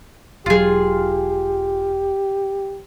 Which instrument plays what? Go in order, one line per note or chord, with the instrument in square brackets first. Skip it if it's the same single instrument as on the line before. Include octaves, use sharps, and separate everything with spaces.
[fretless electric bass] E1 F#3 [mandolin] F4 G#4 [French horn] G4